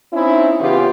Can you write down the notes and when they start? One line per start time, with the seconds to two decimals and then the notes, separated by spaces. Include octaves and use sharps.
0.13 C4 C#4 D#4 E4
0.60 C#3 E3 B3 F4 G4